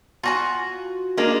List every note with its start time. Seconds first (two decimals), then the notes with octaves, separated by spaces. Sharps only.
0.23 F4 F#4 G#5
1.17 G#3 A#3 D4